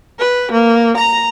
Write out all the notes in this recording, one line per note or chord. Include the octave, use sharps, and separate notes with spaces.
B4
A#3
A#5